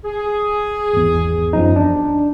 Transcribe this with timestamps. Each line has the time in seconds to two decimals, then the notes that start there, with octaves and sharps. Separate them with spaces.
0.04 G#4
0.93 G#1 E2
1.53 F#2 F3 D#4
1.76 D4